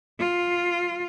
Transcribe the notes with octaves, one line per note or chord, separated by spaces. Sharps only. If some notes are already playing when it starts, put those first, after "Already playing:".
F4